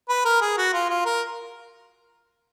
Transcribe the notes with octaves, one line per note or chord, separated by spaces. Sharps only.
B4
A#4
G#4
F#4
F4
F4
A#4